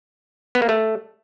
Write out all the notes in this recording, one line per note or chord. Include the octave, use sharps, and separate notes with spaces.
B3
A#3
A3